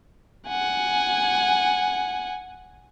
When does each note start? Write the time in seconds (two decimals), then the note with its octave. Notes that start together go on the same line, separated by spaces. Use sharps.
0.48 F#5 G#5